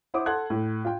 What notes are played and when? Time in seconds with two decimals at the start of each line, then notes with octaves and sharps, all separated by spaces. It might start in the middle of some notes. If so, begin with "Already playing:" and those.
0.14 E4 C5 F#5 D6 D#6
0.26 A4 F#5 A5 C6 F#6 G#6
0.50 A2
0.85 F4 G5